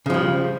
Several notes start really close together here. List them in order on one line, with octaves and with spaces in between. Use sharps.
C#3 F3 G3